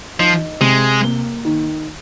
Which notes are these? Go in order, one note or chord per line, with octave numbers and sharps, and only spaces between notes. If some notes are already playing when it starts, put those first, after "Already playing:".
F3 D#4
C3 G#3
A#3
D#3